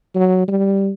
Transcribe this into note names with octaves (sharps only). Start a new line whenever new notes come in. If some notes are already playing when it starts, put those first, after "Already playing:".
F#3
G3